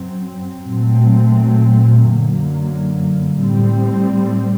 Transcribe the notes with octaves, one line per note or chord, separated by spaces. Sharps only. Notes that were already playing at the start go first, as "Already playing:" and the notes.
Already playing: F#2 F#3 C4
A#2 F#3 A3 C4
F#2 D3 F#3 A#3
A2 G3 C4